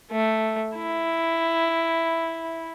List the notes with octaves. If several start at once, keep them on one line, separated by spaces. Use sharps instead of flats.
A3
E4